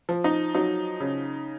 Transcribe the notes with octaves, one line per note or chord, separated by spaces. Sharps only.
F3
D#4
F#3 D#4
C#3